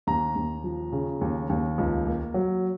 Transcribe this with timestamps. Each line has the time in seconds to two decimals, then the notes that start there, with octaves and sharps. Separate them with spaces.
0.07 D#2 A#5
0.35 D#2
0.64 F3
0.92 C#3
1.21 D#2
1.49 D#2
1.78 C#2
2.06 A#3
2.34 F#3